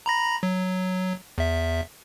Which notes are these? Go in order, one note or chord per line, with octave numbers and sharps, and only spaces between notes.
A#5 B5 A#6
F#3
E2 E5